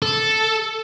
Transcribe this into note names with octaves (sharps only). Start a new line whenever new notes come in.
A4